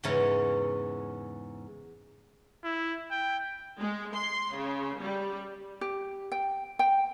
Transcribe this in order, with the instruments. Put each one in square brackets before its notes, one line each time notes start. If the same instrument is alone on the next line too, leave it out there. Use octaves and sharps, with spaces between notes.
[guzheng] E2 G#2 C#3 E3 C#4 A#5
[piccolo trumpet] E4
G5
[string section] G#3
C6
C#3
G3
[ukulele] G4
G5
G5